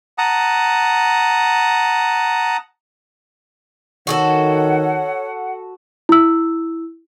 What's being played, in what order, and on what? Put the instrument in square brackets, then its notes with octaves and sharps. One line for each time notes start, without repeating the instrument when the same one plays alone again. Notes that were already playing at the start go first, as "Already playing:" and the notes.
[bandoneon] F#5 A5 A#5 D#6
[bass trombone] D#3 [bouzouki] F#4 G#4 A4 [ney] C#5 [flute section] F#5
[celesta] E4 E6